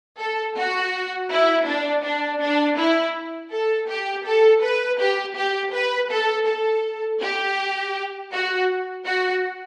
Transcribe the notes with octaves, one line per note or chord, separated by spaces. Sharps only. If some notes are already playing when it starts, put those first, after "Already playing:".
A4
F#4
E4
D4
D4
D4
E4
A4
G4
A4
B4
G4
G4
B4
A4
A4
G4
F#4
F#4